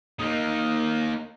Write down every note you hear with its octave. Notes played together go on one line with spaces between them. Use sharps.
A#3 D#4